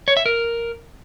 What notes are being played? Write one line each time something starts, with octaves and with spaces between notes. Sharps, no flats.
C#5
E5
A#4